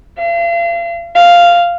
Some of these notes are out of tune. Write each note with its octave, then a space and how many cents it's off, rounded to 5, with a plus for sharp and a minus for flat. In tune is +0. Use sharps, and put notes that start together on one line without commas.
F5 -40
F5 -5